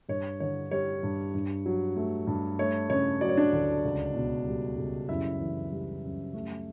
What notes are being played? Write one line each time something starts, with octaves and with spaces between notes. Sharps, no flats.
G2 C#5
D3 C#5
G3 C#5
G2
G2
F#3
A3
G2
A3 C#5
C#3 C#5
F#3 D5
C#5
D4 D5
D2
C#2
B2
G3
C#2
F#2 E4 E5
E3
G3
F#2
A3